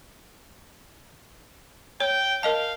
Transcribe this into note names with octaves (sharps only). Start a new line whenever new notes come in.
C#5 G5
A#4 D#5 F5 A5